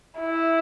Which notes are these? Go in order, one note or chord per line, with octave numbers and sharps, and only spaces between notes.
E4